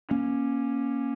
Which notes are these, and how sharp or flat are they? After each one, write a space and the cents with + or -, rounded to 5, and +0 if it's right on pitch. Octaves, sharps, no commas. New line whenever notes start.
A#3 +25 C#4 +0